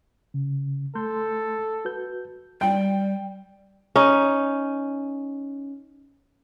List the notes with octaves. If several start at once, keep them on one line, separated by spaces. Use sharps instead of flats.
C#3
A3 A4 C6 G6
F#4 B4 G6
G3 G5
C#4 D#4